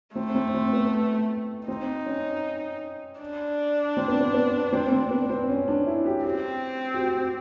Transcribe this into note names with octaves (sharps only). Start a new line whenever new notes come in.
A3 C4
C4
C4
B3
C4 D#4
C#4
D4
C4
B3
C4
B3
C4
C4
B3
C4
C#4
D4
E4
G4
C4 G4
G4
F#4